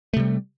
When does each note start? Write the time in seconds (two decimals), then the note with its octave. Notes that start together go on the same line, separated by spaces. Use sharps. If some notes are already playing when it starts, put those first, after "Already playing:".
0.14 A3
0.17 C3
0.20 G3